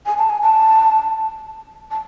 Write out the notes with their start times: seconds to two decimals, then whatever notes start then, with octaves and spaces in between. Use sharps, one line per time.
0.06 G#5
0.18 A5
0.30 G#5
0.43 A5
1.91 A5